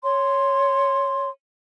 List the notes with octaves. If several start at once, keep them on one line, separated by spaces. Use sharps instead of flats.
C#5 C6